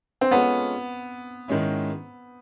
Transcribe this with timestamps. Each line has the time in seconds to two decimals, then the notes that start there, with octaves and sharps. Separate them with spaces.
0.21 C4
0.31 G#3 B3 C#4 F4 A4 C#5
1.48 G#2 D#3 G#3 C#4 E4